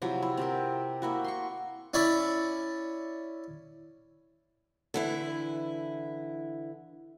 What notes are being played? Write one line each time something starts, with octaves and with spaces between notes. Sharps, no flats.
C3 F3 F#3 E4
E4
C4 G4 A#4
A#3 E4 F#4
C6 C#6
C#4 E4 D5 E5
D3 E3 E4